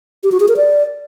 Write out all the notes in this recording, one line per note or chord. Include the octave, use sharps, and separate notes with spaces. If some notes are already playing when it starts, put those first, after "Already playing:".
G4
F#4
G#4
A#4
D5